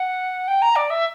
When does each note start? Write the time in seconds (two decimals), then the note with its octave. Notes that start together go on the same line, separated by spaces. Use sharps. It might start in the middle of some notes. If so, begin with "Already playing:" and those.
Already playing: F#5
0.48 G5
0.62 A#5
0.76 D5
0.90 E5